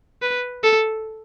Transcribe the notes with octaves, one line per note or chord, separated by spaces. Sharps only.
B4
A4